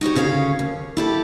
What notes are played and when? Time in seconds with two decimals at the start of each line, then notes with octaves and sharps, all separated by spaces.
0.01 D#4 F#4 G4 C#5
0.15 D2 C#3 C#4 C#5 F5
0.59 D#2
0.97 E4 G4 A4